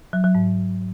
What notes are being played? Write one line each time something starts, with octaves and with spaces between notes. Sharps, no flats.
F#3
F#3
G#2